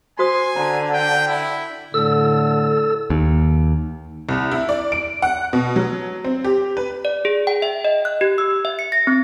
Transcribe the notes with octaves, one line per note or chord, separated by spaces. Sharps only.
F#4 C5 G#5 C6 D#6
D3 A5 A#5
G5
E4
A2 D3 A4 E6
D#2
C2
E4
D5
D7
F#5
B2
F#3
C4
G4
B4
D5
G#4
G5
E5
D#5
F#6
G4
E6
E5
C#7
A#6
C4